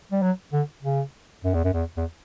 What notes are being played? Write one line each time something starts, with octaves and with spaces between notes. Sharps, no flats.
G3
F#3
D3
C#3
F#2
E2
F#2
E2
E2